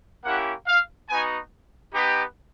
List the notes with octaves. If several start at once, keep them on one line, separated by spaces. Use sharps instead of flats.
A#3 C#4 E4 G4 F#5
F5
B3 D#4 F#4 G#5
B3 D#4 G4